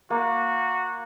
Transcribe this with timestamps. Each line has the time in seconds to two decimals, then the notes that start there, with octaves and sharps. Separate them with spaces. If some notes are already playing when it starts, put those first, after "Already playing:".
0.10 A#3 F#4